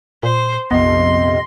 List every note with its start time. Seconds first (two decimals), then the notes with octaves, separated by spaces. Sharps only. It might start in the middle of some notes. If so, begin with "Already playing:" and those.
0.23 A#2 C5
0.71 A#1 F2 C3 B3 D#5 C6